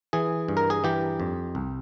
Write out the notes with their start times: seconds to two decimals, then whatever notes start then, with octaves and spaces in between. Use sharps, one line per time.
0.13 E3 G#4
0.48 G2
0.57 A#4
0.70 G#4
0.84 E3 G4
1.20 F2
1.55 C2